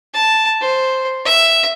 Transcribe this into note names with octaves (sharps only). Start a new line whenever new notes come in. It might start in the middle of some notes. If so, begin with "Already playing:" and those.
A5
C5
E5